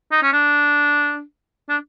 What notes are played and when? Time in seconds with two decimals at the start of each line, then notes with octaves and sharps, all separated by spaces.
0.12 D#4
0.23 C#4
0.33 D4
1.69 D4